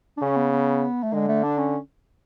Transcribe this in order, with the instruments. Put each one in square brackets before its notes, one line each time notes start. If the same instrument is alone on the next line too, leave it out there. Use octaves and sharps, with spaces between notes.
[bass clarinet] D4
[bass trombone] C#3 [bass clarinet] C#4
[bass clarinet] B3
B3
A3
[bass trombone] D3 [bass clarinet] G#3
[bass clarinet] A3
D4
C#4